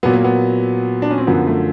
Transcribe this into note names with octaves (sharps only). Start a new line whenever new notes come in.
A#2 F#3 B3
A#3
B3
D4
C#4
C4
F#2 D3 F3 B3
A3